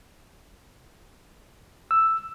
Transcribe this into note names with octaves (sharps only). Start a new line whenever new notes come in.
E6